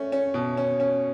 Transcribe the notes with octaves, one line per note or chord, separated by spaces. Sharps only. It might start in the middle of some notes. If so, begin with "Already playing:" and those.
Already playing: A3 C#4
C#4 C#5
B2
C#4
C#4